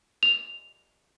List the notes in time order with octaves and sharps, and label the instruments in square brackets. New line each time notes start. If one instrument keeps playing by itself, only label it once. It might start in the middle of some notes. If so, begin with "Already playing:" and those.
[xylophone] F7